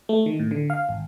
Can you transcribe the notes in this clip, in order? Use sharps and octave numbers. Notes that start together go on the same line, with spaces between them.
A3
D#3
A2
D3
F5
G#1